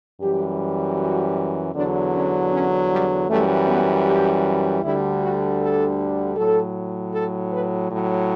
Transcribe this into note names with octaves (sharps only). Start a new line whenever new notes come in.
F#2 E3 G3 G4
F#4
E2 D3 F#3 D4
C#4
C#4
G3
F#2 E3 G3 A3
B3
G4
D2 D3 G3 E4
F#4
A4
A2 F#3 A4
A4
B4
A2 F#3